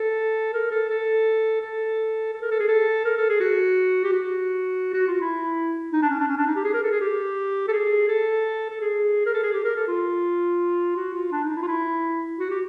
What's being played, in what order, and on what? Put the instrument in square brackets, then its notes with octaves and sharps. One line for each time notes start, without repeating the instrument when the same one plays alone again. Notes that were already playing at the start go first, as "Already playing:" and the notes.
Already playing: [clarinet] A4
A#4
A4
A4
A4
A4
A#4
A4
G#4
A4
A#4
A4
G#4
F#4
G4
F#4
F#4
F4
E4
D#4
D4
C#4
D4
C#4
D4
D#4
G4
G#4
A#4
A4
G#4
G4
A4
G#4
A4
A4
G#4
A#4
A4
G#4
G4
A#4
A4
F4
F#4
F4
D4
D#4
E4
F4
E4
F#4
G4